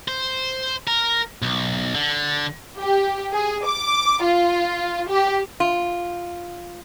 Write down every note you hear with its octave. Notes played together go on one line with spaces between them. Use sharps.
C5
A#4
B1
D3
G4
G#4
D6
F4
G4
F4